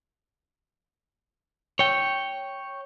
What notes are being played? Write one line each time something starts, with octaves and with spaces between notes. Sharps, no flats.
C#5 G5